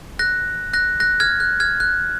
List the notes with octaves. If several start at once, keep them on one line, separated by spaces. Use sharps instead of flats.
F#6 A#6
F#6 A#6
F#6 A#6
F6 G#6
F#6
F6 G#6
F#6